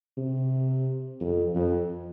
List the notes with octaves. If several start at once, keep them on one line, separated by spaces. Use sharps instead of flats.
C3
F2
F2